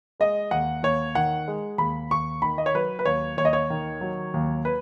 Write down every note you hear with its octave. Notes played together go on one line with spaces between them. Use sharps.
G#3 D#5
D#2 F#5
D#2 C#5
D#3 F#5
G#3
D#2 B5
D#2 C#6
D#3 B5
D#5
C#5
F#3 B4
B4
D#2 C#5
D#2 C#5
D#5
C#5
D#3
F#3
D#2
B4